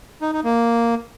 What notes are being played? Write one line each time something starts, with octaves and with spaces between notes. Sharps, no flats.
D#4
D#4
A#3